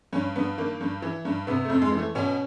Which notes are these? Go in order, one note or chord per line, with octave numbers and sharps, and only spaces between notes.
G2 C#4
G2 B3
D#3 A#3
G2
E3
G2
C3 B3
A3
F2
G#3
E3
A3
B2 C#4